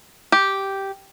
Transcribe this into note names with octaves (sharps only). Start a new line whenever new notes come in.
G4